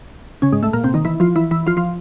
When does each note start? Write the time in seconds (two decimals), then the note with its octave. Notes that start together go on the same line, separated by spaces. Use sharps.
0.42 C#3 C#4
0.53 G#2 G#3
0.63 A2 A3
0.73 A#2 A#3
0.84 C3 C4
0.94 D#3 D#4
1.05 E3 E4
1.20 F3 F4
1.36 E3 E4
1.51 E3 E4
1.67 F3 F4
1.77 F3 F4